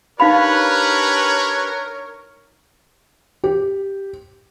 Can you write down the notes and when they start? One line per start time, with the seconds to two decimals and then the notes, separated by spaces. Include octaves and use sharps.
0.20 D4 D#4 G4 A#4 B4 C#5 F5 B5
3.44 G4